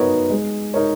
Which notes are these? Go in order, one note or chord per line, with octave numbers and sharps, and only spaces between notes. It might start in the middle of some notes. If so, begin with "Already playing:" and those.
Already playing: F#3 B3 D#4 A#4 C#5
G#3
D#4 A#4 C#5